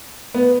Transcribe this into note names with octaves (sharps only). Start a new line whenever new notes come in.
B3